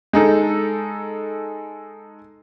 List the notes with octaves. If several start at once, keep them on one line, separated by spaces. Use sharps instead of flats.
G#3 D#4 A4